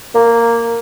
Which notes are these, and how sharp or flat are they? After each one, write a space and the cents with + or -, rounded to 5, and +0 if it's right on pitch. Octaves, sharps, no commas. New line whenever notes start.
A#3 -5